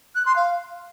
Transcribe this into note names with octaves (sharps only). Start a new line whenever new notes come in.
F#6
C6
F5